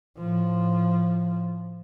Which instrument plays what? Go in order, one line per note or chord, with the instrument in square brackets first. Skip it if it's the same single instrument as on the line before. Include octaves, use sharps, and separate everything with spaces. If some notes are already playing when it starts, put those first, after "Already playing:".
[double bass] A2 F3